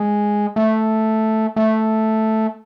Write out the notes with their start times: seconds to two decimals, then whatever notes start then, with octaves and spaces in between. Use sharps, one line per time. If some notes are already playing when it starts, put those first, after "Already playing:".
Already playing: G#3
0.56 A3
1.56 A3